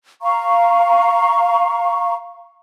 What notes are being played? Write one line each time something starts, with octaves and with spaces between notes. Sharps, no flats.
F5 A#5 C#6